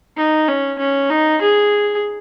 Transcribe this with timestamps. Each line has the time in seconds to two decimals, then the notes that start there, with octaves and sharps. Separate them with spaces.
0.17 D#4
0.48 C#4
0.79 C#4
1.10 D#4
1.42 G#4